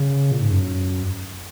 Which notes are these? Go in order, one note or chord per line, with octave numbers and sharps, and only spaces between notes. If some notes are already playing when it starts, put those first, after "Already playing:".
Already playing: C#3
A#2
G#2
F#2